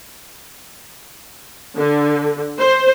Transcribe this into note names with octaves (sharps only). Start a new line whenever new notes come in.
D3
C5